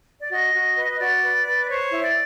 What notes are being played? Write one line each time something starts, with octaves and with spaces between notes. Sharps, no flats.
D5
F#4 D#5
F#4
B4
F#4 D5
B4
B4
C5 C#5
E4
D5